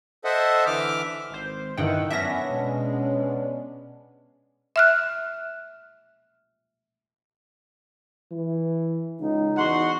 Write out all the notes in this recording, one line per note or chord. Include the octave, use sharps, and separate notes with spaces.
A4 C5 D#5 E5 F#5
D3 E3 E5 D6 F6
G#1 C5
G2 D#3 E4 F#5 G5
F#2 B3 C#4 D4 E5 A#6
B2 G#3
E5 F6 F#6
E3
C#2 D#4
E2 F#4 F#5 C6